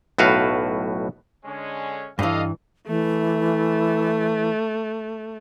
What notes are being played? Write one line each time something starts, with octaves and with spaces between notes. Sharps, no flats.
B1 A2 F#4 B4 F5
D3 G#3 C#4
G2 E3 A4 D#5 F5
E3 A3